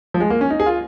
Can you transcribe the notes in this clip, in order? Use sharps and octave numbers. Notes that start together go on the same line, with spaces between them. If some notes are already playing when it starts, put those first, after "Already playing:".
F3
G#3
A#3
C#4
D#4
G#4
F4